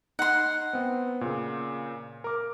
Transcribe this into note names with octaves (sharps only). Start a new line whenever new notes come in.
D#4 F#5 C6
B3 C4
A#2 C#3
A#4 D6